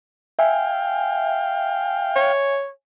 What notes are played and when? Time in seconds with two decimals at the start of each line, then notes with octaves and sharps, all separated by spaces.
0.39 E5 F5 G5 G#5
2.16 C#5